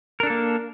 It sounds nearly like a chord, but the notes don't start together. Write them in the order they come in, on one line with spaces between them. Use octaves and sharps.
A#4 D4 A4 A#3